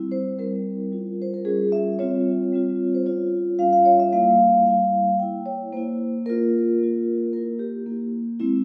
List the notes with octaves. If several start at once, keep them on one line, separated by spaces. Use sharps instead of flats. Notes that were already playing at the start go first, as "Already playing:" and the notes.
Already playing: G3 C4 E4
C5
G3 C4 E4 A#4
G3 C#4 F4
C5
A#4
G3 C#4 F4 G#4
E5
G3 C4 F4 C#5
G3 C4 F4
C5
G3 C#4 F4 C#5
G3 C#4 F4 F5
F5
C#5
E5
G3 A#3 E4 F5
G3 A#3 E4 F5
A#3 E4 G5
C#5
A#3 E4 C5
A#3 F4 A#4
A#3 F4
A#3 E4 A#4
G4
A#3 E4
G#3 C4 E4